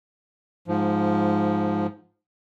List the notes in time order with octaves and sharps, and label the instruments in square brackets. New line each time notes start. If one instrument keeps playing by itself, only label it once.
[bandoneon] G#2 F3